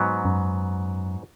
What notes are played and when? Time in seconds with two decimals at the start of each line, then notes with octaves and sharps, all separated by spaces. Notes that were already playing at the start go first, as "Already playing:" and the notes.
Already playing: G#2 F#3 B3
0.25 F#2